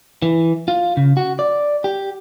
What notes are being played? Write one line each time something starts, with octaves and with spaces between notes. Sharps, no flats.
E3
F4
C#3
F#4
D5
G4